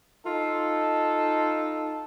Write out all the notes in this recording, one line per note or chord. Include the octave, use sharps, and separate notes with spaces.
D#4 F4 A4